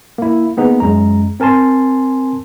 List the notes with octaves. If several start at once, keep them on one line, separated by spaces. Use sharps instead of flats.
A#3 E4
A#3 B3 D#4 G#4
F#2 G#3 A#5
C4 A#4 G#5 A5 C6